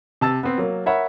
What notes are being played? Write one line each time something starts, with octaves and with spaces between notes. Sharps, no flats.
C3 A5 E6 A6
B3 C4
F#3 A#3
A#4 C#5 E5 F#5 B5